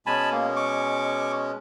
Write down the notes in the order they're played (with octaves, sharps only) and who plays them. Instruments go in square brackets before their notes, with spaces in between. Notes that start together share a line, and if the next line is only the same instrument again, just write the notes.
[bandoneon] B2 G#3 C#4 [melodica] G#5 A5 B5
[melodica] A#3
C#6 D6